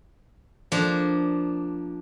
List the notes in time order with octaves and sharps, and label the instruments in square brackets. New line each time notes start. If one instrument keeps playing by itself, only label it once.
[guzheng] F3 A#3 D4